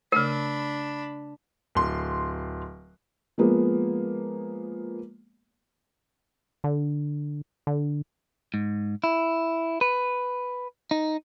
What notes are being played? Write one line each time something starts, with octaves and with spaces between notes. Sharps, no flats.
C#3 A3 D4 A#4 B5
D1 C6
F3 G#3 A#3 B3
D3
D3
G#2
E4
B4
D#4